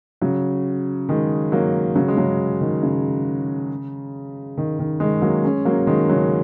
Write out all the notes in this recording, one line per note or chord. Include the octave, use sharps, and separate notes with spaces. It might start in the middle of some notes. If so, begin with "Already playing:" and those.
C#3 F#3
D#3 G#3
F#3 A#3
C#3 F#3
G#3
C#3 F#3
D#3
C#3
D#3
D#3
D#3 G#3
F#3 A#3
G#3 C#4
F#3 A#3
D#3 G#3
C#3 F#3